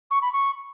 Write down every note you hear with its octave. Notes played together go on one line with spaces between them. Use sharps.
C#6
B5
C#6